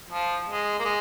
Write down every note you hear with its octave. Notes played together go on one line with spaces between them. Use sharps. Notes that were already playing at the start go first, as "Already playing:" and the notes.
F3
G#3
A#3
G#3